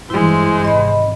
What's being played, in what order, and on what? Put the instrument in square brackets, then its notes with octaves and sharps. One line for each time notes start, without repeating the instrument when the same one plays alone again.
[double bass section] G2 E3 [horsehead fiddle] G#3 C5 [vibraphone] E4
[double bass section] G#1 C3 [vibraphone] D#5 B5